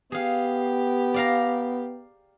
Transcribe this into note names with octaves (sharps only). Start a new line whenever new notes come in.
B3 G4 G#4 F5
D5 F5 A#5